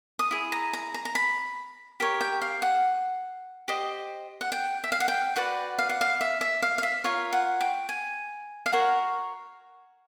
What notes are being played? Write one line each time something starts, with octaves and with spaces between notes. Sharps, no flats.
D#6
E4 G#4
A#5
A#5
A#5
A#5
B5
G4 A#4 C#5
G5
F5
F#5
G4 C5 D#5
F#5
G5
E5
F5
F#5
G5
F#4 B4 D5 F#5
F5
F#5
F5
E5
E5
F5
F5
E5
F4 A#4 C#5 F5
F#5
G5
G#5
F5
F#4 A#4 C#5 F#5